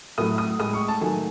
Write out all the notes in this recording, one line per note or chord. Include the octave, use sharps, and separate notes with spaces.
A2 F#3 A3 D#6
D#6
A2 G#3 D#6
C#6
A5
D#3 F#3 A3 G#5